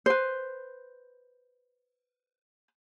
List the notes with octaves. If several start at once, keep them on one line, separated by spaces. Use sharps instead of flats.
B4 C5